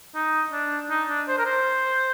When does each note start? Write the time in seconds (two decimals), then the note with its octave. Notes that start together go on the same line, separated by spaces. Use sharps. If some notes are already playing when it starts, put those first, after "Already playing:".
0.15 D#4
0.52 D4
0.90 D#4
1.09 D4
1.28 C5
1.38 A#4
1.46 C5